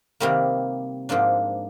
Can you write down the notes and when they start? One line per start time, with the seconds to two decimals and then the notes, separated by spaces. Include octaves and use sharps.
0.20 C3 D#3 G3 A#3
1.09 G#2 F3 A#3 D4